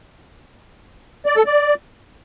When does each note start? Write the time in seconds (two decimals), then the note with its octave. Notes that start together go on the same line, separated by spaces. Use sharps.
1.26 D5
1.36 A4
1.46 D5